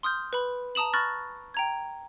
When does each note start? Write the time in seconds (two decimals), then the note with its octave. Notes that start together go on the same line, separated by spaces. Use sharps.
0.03 C6 D#6 F6 G6
0.33 B4 B5
0.75 A5 A#5 D#6 E7 F#7
0.93 B5 C#6 F6 F#6 A6 A#6
1.54 G5 A#5 G#6